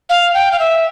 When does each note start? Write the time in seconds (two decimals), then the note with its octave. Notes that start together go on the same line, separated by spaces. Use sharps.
0.09 F5
0.34 G5
0.52 F5
0.59 E5